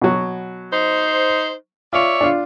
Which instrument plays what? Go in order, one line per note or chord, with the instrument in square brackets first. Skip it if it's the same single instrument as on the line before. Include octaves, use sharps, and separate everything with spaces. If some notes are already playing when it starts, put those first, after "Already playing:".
[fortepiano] B2 F#3
[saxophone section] D#4 C5
[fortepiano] F4 [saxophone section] C#5 D5 E5
[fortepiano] D4 F4